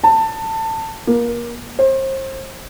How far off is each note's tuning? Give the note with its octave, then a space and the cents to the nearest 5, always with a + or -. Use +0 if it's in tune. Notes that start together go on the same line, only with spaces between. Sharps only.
A5 +20
A#3 +25
C5 +35